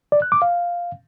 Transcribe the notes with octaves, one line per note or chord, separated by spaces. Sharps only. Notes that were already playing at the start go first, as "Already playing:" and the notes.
D5
F#6
D6
F5